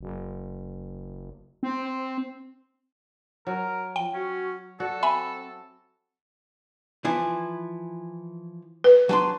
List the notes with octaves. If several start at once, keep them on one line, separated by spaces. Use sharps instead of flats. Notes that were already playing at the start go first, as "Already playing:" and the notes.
F#1
C4
F#3 A#4
F3 G5
C#4 F#4
F#4 A4 D5
C4 E5 G#5 B5
E3 F3 E4
B4
F#3 D4 C6